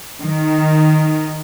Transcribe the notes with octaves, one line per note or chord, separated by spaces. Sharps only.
D#3